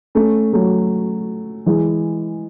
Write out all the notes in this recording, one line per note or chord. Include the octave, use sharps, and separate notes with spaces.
A3 C#4
F#3 A3
E3 G#3